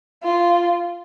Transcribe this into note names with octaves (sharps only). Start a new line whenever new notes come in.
F4